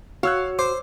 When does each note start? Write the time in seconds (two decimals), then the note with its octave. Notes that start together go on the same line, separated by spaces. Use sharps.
0.23 F#4 C#5 F5 E6 F#6
0.59 C5 D6